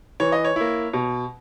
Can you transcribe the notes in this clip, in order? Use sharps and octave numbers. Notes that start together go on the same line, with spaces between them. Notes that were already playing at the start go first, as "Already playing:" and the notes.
E3 C#5
D#5
C#5
A#3 E4
B2